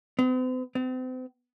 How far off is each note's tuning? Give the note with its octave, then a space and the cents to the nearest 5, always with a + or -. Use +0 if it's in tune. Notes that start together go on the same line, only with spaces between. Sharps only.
C4 -45
C4 -40